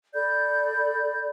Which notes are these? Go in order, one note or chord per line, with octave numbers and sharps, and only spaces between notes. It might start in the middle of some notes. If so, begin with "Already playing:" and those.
A4 D5 B5 G6